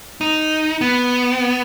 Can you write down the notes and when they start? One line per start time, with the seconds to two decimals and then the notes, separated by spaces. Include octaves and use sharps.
0.21 D#4
0.81 B3